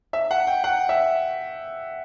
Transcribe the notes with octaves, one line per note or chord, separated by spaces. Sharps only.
E5
F#5
G5
F#5
E5